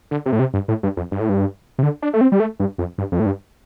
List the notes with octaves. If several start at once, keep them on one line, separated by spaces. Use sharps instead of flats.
D3
C3
A2
C3
G2
A2
G2
F2
G2
A2
G2
C3
D3
D4
A3
C4
G3
A3
G2
F2
G2
F2
A2
G2